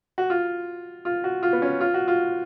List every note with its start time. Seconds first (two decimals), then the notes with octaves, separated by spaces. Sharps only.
0.18 F#4
0.30 F4
1.05 F4
1.24 F#4
1.43 F4
1.53 B3
1.62 C#4
1.81 F4
1.94 F#4
2.08 F4